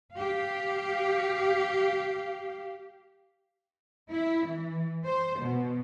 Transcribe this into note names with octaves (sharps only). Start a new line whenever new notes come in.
G4 F5
E4
E3
C5
B2